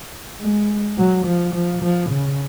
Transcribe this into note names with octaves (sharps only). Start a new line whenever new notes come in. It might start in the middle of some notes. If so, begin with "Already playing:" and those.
G#3
F#3
F3
F3
F3
C#3